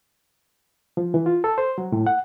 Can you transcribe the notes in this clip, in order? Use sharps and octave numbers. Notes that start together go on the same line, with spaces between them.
F3
E3
F4
A4
C5
F#3
A2
F#5